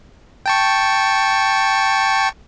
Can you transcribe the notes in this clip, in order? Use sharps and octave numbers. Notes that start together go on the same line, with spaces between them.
G5 A5 C#6